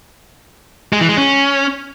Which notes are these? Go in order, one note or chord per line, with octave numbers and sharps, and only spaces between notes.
G#3
E3
G#3
C#4